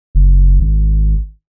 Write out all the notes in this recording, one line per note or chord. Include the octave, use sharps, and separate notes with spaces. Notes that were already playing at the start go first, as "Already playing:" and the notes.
F#1
G#1